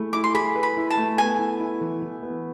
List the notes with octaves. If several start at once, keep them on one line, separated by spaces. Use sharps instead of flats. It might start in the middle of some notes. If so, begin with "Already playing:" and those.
Already playing: A3 E4 G#4
E4 D6
C6
G#4 B5
B4
B5
E4
A5
A3
B3 G#5
E4
E4
E3
E3
B3